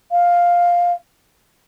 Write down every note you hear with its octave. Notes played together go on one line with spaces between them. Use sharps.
F5